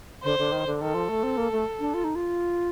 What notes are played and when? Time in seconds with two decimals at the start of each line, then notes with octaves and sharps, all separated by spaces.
0.24 D3 C5
0.39 D3
0.52 D#3
0.67 D3
0.81 D#3 A4
0.94 F3
1.09 A3
1.23 C4
1.37 A#3
1.52 A3
1.80 D4
1.94 F4
2.04 D#4
2.16 F4